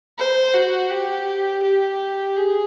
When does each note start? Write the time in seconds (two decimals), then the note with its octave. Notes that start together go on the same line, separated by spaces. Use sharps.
0.18 C5
0.54 F#4
0.91 G4
1.62 G4
2.36 G#4